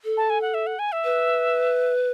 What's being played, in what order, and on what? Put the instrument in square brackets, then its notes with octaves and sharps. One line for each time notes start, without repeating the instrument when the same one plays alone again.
[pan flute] A4
[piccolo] A5
G#5
F#5
E5
F#5
G#5
E5
[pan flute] B4